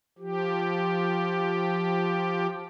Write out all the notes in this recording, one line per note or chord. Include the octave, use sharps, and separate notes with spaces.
F3 G4